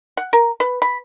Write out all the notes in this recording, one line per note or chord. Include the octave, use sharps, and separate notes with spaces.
F#5
A#4
B4
B5